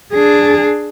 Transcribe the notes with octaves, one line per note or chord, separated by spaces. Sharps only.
D4 G#4